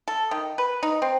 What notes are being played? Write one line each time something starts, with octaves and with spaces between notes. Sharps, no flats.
A4
D#3
B4
D#4
C4